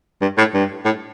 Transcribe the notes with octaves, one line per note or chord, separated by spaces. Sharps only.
G2
A2
G2
A2